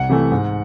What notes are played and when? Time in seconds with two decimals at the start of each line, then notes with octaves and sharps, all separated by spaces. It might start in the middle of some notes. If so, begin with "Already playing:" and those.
Already playing: C2 F#5
0.09 C3 E3 A3
0.32 G#2